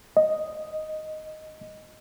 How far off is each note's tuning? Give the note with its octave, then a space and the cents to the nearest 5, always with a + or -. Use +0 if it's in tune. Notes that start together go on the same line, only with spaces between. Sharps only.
D#5 +0